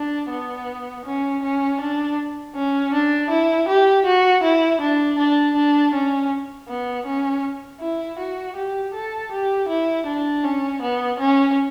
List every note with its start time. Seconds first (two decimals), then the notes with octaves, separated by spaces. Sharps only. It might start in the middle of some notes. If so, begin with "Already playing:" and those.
Already playing: D4
0.30 B3
1.05 C#4
1.43 C#4
1.80 D4
2.55 C#4
2.93 D4
3.30 E4
3.68 G4
4.06 F#4
4.43 E4
4.81 D4
5.18 D4
5.56 D4
5.94 C#4
6.68 B3
7.06 C#4
7.81 E4
8.19 F#4
8.56 G4
8.94 A4
9.31 G4
9.69 E4
10.06 D4
10.44 C#4
10.82 B3
11.19 C#4